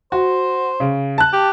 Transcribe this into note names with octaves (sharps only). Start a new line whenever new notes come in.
F#4 C5
C#3
A5 F#6
G4